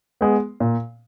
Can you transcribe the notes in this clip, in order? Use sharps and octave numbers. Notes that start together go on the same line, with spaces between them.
G#3 B3
A#2